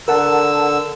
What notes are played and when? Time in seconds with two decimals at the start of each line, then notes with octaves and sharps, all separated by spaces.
0.08 D3 A#4 F#5 A5 E6